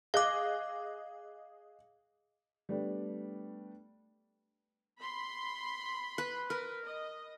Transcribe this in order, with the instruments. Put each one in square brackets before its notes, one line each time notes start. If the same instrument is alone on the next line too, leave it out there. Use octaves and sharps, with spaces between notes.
[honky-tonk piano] G#4 D#5 F#6 [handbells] F5 D6
[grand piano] G3 A3 B3 D4
[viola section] B5 C6
[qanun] B4
[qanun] A#4 [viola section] B4
[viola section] D#5